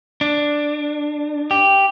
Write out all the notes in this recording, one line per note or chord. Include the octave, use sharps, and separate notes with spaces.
D4
G4